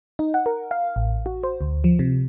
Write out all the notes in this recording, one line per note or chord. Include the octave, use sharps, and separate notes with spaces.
D#4
F#5
A#4
F5
A1
F#4
C5
D2
F3
C3